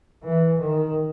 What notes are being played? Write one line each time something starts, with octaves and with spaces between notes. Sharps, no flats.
E3
D#3